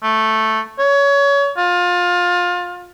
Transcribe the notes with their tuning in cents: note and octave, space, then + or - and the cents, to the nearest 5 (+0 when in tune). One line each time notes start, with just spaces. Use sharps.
A3 +0
C#5 +25
F4 +25